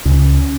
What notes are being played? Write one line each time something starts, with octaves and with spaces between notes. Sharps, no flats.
C#2 C#3 C#4